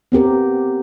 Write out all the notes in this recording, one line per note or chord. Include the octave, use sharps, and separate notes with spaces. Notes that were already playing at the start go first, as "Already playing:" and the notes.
B3 C4 G4 A#4